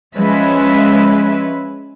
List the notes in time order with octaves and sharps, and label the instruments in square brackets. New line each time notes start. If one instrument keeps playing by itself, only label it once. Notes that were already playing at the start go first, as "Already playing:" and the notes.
[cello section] F3 G#3 C#4 B4 E5